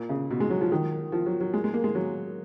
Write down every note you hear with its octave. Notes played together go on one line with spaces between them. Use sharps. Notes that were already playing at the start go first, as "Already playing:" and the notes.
Already playing: A#2
C#3
B2
G#3
F#3
F3
D#3
F3
F#3
F#3
G#3
G#3
A#3
G#3
F#3